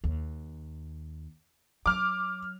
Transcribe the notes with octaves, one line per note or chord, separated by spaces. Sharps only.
D#2
F#3 D6 F6